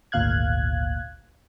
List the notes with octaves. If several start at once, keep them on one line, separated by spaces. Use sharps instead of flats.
G#1 D2 A#2 F5 F#6 G#6